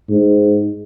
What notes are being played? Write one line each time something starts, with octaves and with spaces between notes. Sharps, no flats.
G#2